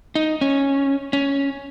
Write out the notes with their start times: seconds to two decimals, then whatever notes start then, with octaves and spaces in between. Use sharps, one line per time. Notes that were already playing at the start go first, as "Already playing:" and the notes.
0.15 D#4
0.41 C#4
1.13 C#4